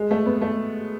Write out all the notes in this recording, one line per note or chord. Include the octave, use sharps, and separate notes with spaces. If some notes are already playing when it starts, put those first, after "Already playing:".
Already playing: G#3
A3
B3
A3